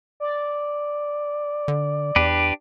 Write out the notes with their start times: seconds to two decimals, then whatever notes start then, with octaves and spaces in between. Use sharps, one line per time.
0.20 D5
1.68 D3
2.16 E2 D4 G4 B4